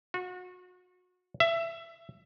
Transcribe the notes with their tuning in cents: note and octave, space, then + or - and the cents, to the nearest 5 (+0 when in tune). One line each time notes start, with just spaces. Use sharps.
F#4 -30
E5 +15